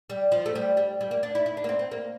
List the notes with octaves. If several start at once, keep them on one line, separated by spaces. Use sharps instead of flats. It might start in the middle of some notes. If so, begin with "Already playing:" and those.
G3
F3
A3
G3
G3
G3
A#3
D4
E4
E4
D4
A#3
C4
C4
A#3